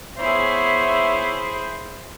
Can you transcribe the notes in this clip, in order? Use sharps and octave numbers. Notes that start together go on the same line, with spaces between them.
B3 E4 G#4 C5 C#5 E5